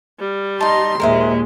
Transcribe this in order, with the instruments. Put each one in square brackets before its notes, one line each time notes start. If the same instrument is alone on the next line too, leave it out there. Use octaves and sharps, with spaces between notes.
[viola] G3
[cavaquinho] D#4 A5 [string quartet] D#5 A#5 C6
[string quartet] D#2 A#2 [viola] G#3 [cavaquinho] A#4 C5 E5